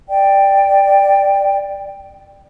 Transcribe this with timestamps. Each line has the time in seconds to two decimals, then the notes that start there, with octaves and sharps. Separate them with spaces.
0.09 D5 G5